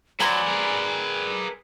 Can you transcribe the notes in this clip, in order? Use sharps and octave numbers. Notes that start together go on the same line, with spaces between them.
F#3 B4 C5 D5 G#5 A#5 B5
G#4 A#4